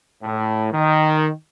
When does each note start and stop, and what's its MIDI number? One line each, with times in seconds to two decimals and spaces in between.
0.23 0.68 45
0.72 1.30 51